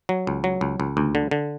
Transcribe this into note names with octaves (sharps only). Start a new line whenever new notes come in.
F#3
C#2
F#3
C#2
C#2
D2
D3
D3